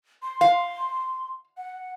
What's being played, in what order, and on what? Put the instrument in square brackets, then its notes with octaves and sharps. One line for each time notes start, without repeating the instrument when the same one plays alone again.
[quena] C6
[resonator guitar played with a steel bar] F5
[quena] F#5